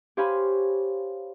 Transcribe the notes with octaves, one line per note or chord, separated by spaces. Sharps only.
G4 C5 C#5 F5 G#5 B5